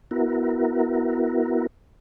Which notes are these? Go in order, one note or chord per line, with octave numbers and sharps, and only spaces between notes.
B3 E4 F#4 A#4